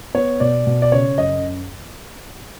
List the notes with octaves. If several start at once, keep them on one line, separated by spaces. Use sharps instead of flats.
B3 C#5
B2 D5
B2
D5
C#3 C#5
F#2 D#5